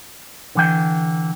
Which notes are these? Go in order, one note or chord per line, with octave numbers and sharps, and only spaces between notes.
D3 E3 G5